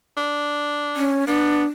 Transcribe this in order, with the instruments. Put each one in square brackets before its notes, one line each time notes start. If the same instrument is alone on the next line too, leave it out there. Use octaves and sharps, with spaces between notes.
[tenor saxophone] D4
[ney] C#4
[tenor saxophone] B3 [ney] D4